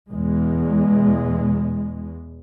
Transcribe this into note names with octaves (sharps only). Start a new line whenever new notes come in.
E2 B2 G#3